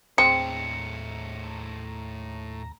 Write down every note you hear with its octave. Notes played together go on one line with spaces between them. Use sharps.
D#2 A2 G#3 C4 C5 A#5 C#7